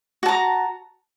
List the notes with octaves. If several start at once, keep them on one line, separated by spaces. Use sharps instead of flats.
F#4 A5 A#5